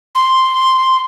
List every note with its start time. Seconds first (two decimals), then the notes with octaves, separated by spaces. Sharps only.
0.15 C6